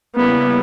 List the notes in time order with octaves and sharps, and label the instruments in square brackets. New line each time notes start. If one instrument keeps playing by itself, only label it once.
[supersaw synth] C#3 G3 A#3 E4 [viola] B3